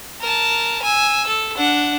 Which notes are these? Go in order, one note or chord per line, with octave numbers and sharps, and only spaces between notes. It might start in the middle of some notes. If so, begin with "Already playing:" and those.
A#4 A5
G#5 E6
A4
D4 F#5